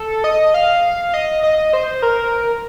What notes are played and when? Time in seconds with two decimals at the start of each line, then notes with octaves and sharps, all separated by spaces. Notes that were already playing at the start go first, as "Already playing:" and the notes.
Already playing: A4
0.24 D#5
0.54 F5
1.14 D#5
1.43 D#5
1.73 C5
2.02 A#4